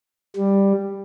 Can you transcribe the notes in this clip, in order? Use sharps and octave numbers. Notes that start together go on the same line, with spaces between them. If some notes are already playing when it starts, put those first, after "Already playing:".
G3